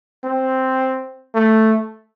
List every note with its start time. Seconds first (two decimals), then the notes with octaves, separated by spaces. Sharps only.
0.24 C4
1.35 A3